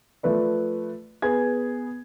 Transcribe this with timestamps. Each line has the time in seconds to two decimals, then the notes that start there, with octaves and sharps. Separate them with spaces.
0.23 F3 A3 B4 D5
1.22 B3 G#4 G#6